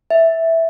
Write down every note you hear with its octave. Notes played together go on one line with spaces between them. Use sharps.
E5